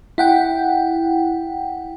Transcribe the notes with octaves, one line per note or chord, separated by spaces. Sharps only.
E4 F#5 G5